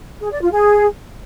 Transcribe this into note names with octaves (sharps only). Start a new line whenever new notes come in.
G#4
D5
F4
G#4